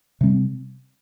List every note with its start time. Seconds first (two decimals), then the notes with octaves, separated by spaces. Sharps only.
0.21 C3 G3 C4